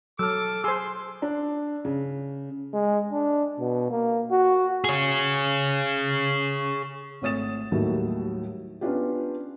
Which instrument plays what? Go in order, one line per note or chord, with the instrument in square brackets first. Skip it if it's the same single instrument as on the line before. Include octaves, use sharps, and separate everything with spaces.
[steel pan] F#3 [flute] A4 [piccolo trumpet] D6 [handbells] E6 F6
[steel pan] G#4 C5 [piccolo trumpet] C6 [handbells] E6
[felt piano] D4
C#3
[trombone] G#3
D4
B2
A#3
F#4
[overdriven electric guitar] G#4 C#5
[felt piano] G#1 A3 C#5 D#6 A6 E7
D#2 A2 D#3 F#3 G3 A3
B3 C#4 D4 F4 G4